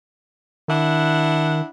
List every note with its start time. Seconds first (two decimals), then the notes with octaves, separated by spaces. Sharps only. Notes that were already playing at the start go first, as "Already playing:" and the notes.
0.68 D#3 D4 E4 F#5